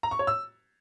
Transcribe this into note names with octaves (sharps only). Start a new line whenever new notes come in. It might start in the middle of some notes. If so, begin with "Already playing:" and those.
A#5
C#6
C#5
E6